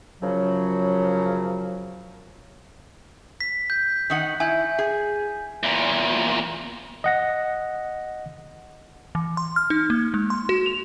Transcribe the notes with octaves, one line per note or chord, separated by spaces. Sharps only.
F#2 C#3 F3 F#3
B6
G6
D#3 D#4 F#5
E4 G#5 G6
G#4
E2 A#2
D#5 F#5 A#6
E3
C6
F6
D#4
A#3
G#3
C6
F#4
F7